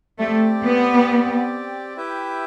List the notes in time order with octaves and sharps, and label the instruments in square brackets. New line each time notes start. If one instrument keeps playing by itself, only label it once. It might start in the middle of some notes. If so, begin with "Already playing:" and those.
[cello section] A3 [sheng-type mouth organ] C4 G4 D5
[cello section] B3
[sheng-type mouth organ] E4 G4 B4 E5 G5